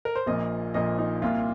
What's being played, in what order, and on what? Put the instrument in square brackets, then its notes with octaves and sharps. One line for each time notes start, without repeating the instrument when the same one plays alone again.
[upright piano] A#4
C5
A#1 A#2 F3 A#3 D#5
A#1 A#2 F3 A#3 D#5
D#4
C2 A#2 A#3 F4